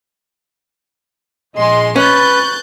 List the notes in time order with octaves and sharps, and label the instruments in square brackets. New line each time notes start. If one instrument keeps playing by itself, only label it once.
[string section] A#1 G#3 C6 [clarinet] D#5
[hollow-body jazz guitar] C#4 [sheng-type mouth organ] B4 B5 [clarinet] C#6 [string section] F#6 G6 A6